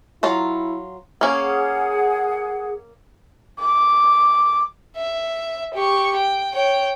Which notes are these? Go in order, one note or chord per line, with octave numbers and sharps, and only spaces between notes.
F#3 E4 F4 A#5
A#3 C#4 G#4 F#5
D6
E5
G4 C#6
G5
C#5 G5